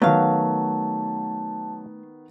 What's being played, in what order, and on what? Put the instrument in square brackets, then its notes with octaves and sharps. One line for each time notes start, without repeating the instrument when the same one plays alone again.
[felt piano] D#3 B3 [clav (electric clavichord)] F#3 [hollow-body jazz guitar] A3 F5 [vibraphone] A5